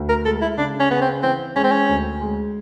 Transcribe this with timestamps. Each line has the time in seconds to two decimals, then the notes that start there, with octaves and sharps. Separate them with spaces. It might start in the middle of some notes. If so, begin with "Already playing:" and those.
Already playing: D2
0.09 A#4
0.25 G#3 A4
0.42 E4
0.58 C#3 D4
0.80 C#4
0.91 C#3 B3
1.01 C4
1.23 E3 C4
1.56 G#3 C#4
1.64 C4
1.71 C#4
1.89 D2
2.21 G#3